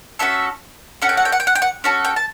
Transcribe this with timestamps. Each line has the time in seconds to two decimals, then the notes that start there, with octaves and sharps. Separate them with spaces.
0.19 C#4 F#4 A4 E5
1.02 C#4 F#4 A4 F#5
1.09 G5
1.17 F#5
1.25 G5
1.32 F#5
1.40 G5
1.47 F#5
1.55 G5
1.62 F#5
1.84 C#4 F#4 A4
2.05 G5
2.16 A5